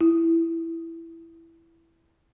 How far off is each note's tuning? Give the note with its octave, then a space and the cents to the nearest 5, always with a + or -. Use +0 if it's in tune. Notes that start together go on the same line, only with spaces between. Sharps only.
E4 +5